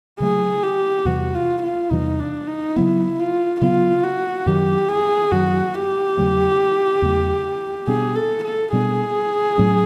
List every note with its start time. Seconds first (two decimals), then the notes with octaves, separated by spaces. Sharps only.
0.20 C#3 F#3 A3 G#4
0.63 G4
1.05 E2 C3 E3 G3 F#4
1.35 F4
1.63 F4
1.91 E2 C3 E3 G3 D#4
2.19 D4
2.48 D#4
2.76 C#3 F#3 B3 E4
3.19 F4
3.61 C#3 F#3 B3 F4
4.04 F#4
4.46 F#2 D#3 F#3 G4
4.89 G#4
5.32 F#2 D#3 F#3 F#4
5.75 G4
6.17 E2 C#3 F#3 A3
7.02 E2 C#3 F#3 A3
7.87 B2 G3 B3 D4 G#4
8.15 A4
8.44 A4
8.72 B2 G3 B3 D4 G#4
9.58 A2 F#3 A3 C#4